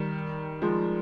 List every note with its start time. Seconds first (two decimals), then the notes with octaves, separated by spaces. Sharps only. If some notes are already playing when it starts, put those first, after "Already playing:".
Already playing: D#3 G3
0.62 F3 G#3